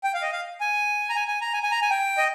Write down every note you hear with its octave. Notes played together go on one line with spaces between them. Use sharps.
G5
F5
D#5
F5
G#5
A#5
G#5
G#5
A#5
G#5
G#5
A#5
G#5
G5
D#5